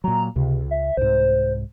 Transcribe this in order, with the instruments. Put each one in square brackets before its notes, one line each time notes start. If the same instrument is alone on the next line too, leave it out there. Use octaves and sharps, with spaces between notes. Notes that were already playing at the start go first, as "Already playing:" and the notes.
[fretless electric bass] A#2 F#3 [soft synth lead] A#5
[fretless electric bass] C#2 [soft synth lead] C3
[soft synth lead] E5
[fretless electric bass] C2 G#2 [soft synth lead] C5